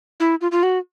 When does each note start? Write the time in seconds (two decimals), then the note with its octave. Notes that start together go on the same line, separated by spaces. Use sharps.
0.20 E4
0.41 F4
0.52 F4
0.63 F#4